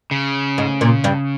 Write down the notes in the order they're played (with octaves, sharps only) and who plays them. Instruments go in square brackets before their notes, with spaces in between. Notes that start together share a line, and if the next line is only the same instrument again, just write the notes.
[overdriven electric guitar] C#3
[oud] G#2
A#2
G2 G3